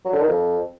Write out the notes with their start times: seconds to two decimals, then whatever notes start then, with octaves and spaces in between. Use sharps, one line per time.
0.05 F#3
0.13 D3
0.20 D#3
0.28 F2